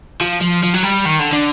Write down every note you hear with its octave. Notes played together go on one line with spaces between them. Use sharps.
F3
F3
F3
F#3
G3
D#3
D3
D3